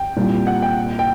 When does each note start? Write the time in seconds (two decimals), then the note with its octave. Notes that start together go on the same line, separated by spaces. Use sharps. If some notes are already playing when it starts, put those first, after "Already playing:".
Already playing: G5
0.17 C2 A#2 G3
0.47 F#5
0.62 G5
0.99 G5